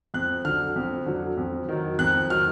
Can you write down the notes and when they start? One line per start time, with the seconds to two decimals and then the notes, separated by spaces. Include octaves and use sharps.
0.14 F2 F#6
0.45 D3 F#3 F6
0.76 F2
1.06 D3 F#3
1.37 F2
1.69 D#3 F#3
1.99 F2 F#6
2.30 D#3 F#3 F6